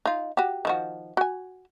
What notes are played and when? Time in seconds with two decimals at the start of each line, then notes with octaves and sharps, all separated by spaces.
0.06 D#4 F4
0.37 F#4 G4
0.65 D#3 F3 F#4
1.17 F#4 G#5